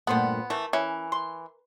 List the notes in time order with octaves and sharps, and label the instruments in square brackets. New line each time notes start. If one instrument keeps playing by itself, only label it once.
[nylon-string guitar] G2 A#2 A3 [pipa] F3 C5 F#5 [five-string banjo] B3
[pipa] E3 A3 [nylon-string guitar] A#4
[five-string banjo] E3 [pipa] C#4
[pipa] C6